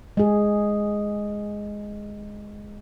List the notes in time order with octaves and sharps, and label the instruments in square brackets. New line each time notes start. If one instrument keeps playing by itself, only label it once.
[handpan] G#3 G#4